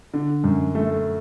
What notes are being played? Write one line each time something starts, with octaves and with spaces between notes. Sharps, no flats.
D3
F#2
A3